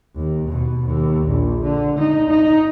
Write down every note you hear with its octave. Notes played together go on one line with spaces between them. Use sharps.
D#2
B2
D#2
A#1
D3
D#4
D#4